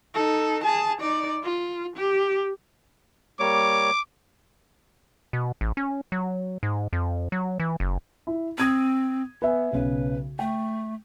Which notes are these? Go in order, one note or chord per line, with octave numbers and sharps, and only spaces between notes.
D#4 A4
G#4 A5
D#4 D5
F4
G4
G3 A#3 C#5 D6
B2
A1
C#4
F#3
G#2
F2
F#3
E3
F#1
E4
C4 D#6 G#6 D#7
B3 B4 E5 G#5
B1 C#3 B4
A3 G5